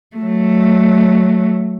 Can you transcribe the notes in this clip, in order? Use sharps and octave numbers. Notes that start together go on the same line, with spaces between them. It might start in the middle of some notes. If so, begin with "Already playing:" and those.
F#3 A3